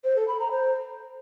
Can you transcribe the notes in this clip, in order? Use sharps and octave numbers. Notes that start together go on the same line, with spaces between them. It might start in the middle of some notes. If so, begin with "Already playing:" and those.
C5
A4
B5
A#5
C5